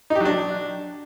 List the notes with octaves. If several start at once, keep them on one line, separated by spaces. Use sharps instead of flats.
D#4
G4
F#3
D4